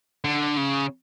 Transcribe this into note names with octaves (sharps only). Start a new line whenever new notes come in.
D3
C#3